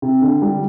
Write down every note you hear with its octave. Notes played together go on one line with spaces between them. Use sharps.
C3
D3
G3